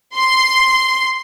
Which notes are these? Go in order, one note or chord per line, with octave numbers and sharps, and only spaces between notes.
C6